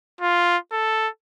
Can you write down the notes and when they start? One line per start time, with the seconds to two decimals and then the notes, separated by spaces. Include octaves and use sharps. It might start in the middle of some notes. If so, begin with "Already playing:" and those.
0.21 F4
0.72 A4